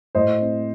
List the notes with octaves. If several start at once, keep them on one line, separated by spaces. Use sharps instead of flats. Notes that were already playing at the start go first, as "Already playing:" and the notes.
A2 C5 D#5
C4